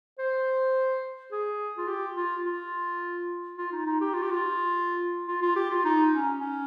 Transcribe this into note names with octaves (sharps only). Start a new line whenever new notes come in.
C5
G#4
F4
G4
F4
F4
F4
D#4
D#4
G4
F4
G4
F4
F4
F4
G4
F4
D#4
C#4
C#4